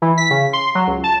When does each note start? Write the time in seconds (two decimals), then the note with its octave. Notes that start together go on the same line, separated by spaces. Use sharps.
0.02 E3
0.18 B6
0.31 C#3
0.53 C6
0.75 F#3
0.87 C#2
1.04 A5